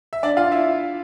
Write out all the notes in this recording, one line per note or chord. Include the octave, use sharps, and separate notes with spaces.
E5
D4 D5
F4 F5
E4 E5